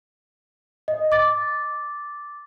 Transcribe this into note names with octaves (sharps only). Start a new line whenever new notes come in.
D#5
D6 A6